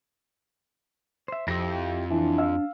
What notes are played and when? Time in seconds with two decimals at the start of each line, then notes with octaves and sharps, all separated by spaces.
1.28 C5 E5
1.48 F2 E4 G4 E6 A#6
2.10 E3 D4
2.38 F5 E6